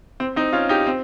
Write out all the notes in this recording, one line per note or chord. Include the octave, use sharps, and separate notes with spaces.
C4
C4 D#4
C#4 F4
D#4 G4
C4